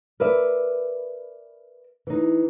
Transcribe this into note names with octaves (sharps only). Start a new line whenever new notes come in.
A#4 B4 D5 E5
E3 D#4